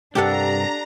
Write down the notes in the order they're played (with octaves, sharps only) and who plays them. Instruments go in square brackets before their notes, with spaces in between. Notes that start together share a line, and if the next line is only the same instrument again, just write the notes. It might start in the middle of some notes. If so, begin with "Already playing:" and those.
[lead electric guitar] C2 G2 [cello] D4 [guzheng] G4 A4 F#5 [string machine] A#5